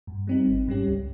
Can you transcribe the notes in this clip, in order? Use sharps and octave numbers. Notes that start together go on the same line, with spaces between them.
G2
G3 C4 D#4
G#1
G#2 G3 C#4 G4
C#2